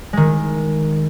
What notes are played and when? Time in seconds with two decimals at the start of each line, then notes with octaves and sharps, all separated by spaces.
0.13 D#3 G#3